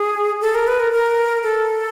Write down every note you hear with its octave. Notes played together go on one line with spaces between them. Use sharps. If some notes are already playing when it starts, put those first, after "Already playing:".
Already playing: G#4
A4
A#4
B4
A#4
A#4
A4